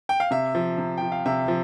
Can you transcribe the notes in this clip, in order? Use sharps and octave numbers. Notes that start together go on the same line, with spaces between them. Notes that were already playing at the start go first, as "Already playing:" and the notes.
G5
F5
C3 E5
F3
C3
F3 G5
F5
C3 E5
F3